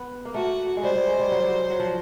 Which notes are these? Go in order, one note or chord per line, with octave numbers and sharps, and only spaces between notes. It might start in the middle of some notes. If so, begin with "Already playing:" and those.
Already playing: B3
A#3
A3 F#4
G#3
G3 C5
G3
G#3
G3
F#3
G3
F#3
F#3
F3